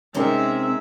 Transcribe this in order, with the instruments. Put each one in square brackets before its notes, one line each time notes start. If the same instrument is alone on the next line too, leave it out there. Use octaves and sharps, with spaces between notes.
[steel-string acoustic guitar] C3 C4 [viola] G#3 E5 [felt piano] C#4 D#4 A#4